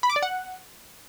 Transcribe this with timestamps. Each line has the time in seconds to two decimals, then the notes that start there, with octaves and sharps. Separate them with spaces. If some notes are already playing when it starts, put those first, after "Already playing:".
0.03 B5
0.10 D6
0.16 D5
0.23 F#5